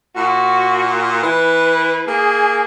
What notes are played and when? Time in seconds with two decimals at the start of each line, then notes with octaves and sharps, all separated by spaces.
0.16 A#2 F#4
1.23 E3 B4
2.08 A#3 G#4